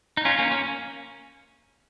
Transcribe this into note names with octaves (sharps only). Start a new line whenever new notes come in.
D#4
C#4 F4
A#3 C#4
A#3 C#4